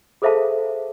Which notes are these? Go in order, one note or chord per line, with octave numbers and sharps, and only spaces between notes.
G#4 A4 C5 E5 F5 A5